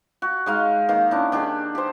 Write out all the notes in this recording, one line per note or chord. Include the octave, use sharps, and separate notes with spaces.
F#4
G#3 D#4 F5
D#3 A#3 F5 F#5
C#4 D4 E4
D#3 D4 G4 G#4
G4 C5